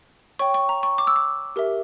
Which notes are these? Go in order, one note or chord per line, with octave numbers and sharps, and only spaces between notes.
C#5 G5 C#6
C#6
A#5
C#6
D6
E6
D6
G4 A#4 E5